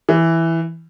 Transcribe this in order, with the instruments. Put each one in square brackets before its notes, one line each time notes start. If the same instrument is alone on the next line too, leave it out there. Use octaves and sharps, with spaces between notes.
[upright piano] E3